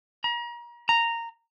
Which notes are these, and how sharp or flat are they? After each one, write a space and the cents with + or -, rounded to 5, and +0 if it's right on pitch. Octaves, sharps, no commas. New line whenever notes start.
A#5 +35
A#5 -10